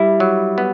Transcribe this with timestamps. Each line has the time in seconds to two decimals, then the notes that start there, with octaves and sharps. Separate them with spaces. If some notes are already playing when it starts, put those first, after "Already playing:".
Already playing: G3 E4
0.20 F#3
0.58 B3